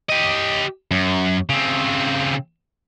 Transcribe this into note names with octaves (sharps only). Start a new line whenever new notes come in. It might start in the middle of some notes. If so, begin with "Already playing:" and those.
G4 D#5
F#2
C#3 C4